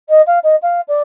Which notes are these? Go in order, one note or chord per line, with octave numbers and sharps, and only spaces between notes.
D#5
F5
D#5
F5
D5